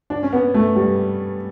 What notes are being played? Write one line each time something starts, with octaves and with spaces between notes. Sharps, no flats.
D4
C#4
B3
A3
G3